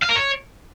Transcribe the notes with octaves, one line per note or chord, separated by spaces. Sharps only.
F5
A#4
C#5